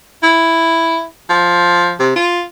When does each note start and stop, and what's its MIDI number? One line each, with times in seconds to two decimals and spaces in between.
0.23 1.04 64
1.29 1.93 53
1.99 2.16 48
2.16 2.44 65